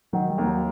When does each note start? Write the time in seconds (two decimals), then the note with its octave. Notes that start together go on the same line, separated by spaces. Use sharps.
0.13 D#3 F#3
0.30 G3
0.38 D#2
0.47 F#3